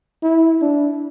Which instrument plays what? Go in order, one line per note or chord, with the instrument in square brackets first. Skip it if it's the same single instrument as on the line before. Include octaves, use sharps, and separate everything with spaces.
[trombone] E4
D4